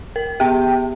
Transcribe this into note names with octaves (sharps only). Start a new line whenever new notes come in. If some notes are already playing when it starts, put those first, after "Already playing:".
A#4
B3 G4 G5